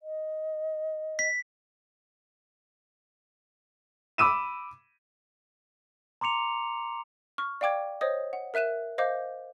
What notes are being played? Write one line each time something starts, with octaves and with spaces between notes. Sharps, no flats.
D#5
B6
B5 D6 E6 D#7 E7
A#5 C6 D6 C#7 F7
C#6 F6
D5 F5 G5 D6 G#6
C5 C#5 D#5 D#6
F#5
A#4 E5 F#6 D#7 E7
C5 D#5 F5 D6 G6